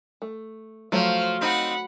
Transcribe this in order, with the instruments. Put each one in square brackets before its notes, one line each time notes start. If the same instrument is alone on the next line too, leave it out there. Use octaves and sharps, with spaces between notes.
[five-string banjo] A3
[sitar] F3 [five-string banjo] F#3 A3 [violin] C5 F6
[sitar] C4 D#4 [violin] F#5 B5